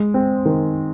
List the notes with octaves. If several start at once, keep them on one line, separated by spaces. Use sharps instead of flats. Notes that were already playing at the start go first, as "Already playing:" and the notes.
Already playing: G#3
C4
D#3